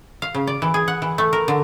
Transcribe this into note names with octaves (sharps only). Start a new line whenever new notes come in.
F5
C#3
D5
E3
G#4
F#5
E3
A3
A#4
D3